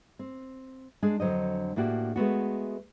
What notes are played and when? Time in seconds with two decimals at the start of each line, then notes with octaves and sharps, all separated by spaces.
0.19 C4
1.02 G#3 D4 G#4
1.20 F2 D3 F#3 C5 D#5
1.76 A2 A#3 D4 F#4 G4
2.16 G#3 A3 B3 F#4